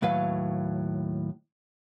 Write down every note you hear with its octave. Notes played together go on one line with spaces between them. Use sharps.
D#2 A2 F#3 B4 F5